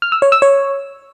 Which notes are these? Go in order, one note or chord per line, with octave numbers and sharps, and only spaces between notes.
F6
E6
C#5
E6
C#5